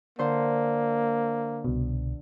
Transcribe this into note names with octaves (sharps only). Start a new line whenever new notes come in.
D3 A#3 C5
C2 B2